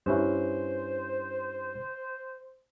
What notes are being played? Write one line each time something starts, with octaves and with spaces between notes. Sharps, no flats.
G2 C#4 E4 C5